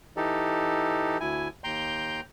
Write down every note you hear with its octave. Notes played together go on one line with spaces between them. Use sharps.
E3 D#4 G4 A4
D2 E4 G#5
D#2 G5 A#5 C6 G6